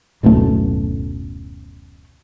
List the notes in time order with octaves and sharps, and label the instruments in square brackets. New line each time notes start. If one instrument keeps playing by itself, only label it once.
[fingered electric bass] D1 B1 F#2 A3